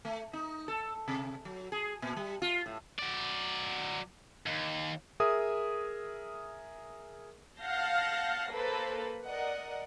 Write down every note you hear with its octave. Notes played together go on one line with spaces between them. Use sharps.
A3
D#4
A4
C3
F#3
G#4
A#2
G3
F4
A2
F#3 D5
D#2
G#4 A#4 E5 D#6
F5 F#5 A5 G6 A#6 C7
A#3 A4 B4 C5
A#4 D5 D#5 F#5